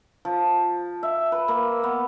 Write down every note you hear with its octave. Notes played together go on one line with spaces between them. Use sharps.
F3
E5
B4
A#3
B3